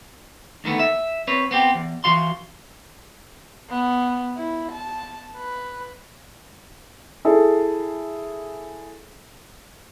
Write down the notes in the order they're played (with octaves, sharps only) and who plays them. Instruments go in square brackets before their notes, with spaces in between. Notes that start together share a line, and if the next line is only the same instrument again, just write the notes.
[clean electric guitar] D2 D#3 A3 B3
E5
C4 B4 C#5
B3 C4 G4
E2
E3 F#4 F5 C6
[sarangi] B3
E4
A5
B4
[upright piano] E4 G#4 A4